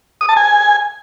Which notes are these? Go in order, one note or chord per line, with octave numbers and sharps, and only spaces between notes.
D#6
A5
G#5